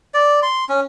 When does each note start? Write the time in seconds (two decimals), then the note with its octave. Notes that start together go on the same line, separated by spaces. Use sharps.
0.14 D5
0.43 C6
0.69 C#4